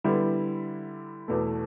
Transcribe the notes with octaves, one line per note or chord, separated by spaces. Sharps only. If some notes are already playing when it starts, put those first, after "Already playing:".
D3 G3 B3 E4
E2 B2 A3